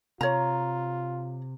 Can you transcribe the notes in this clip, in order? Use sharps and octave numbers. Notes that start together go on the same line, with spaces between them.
C3 F4 C#5 A#5